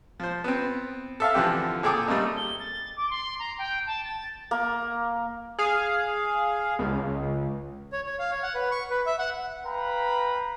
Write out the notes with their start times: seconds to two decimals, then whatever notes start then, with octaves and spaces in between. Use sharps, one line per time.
0.20 F3 C5
0.44 B3 C4
1.20 A4 E5 F5
1.34 D3 E3 F3 C4 G4
1.83 A#2 G#4 A4 G5 D6 D#6
2.08 G3 A3 A#3 C4 D#4
2.37 G7
2.59 A6
2.97 D6
3.10 C6
3.39 A#5
3.58 G5
3.86 A5
4.04 A6
4.51 A#3
5.58 G#4 F5
6.79 C#2
7.92 C#5
8.06 C#5
8.19 F5
8.31 C#5
8.43 F#5
8.55 B4
8.71 C#6
8.90 B4
9.06 E5
9.19 F#5
9.65 B4 F5 G5 A#5 B5